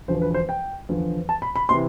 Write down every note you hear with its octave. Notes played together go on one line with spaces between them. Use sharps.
E1 E2 D3 F3 C5
B4
C5
G5
E2 D3 F3
A5
B5
B5
C3 E3 C6